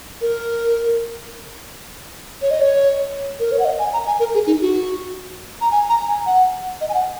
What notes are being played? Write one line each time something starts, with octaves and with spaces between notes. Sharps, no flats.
A#4
C#5
D#5
C#5
A#4
C#5
F#5
D#5
G#5
A#5
G#5
A#4
G#4
D#4
F#4
A#5
G#5
A#5
G#5
F#5
D#5
G#5
F#5